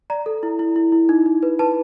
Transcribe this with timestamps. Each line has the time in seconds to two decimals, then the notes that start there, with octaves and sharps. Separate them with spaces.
0.10 D5 A#5
0.26 A4
0.43 E4
0.59 E4
0.76 E4
0.92 E4
1.09 D#4
1.26 D#4
1.43 B4
1.59 B4 A5